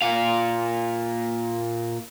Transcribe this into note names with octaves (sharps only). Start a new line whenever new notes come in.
A#2 F5